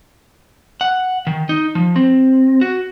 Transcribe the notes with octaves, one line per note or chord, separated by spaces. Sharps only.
F#5
D#3
D#4
F3
C4
F#4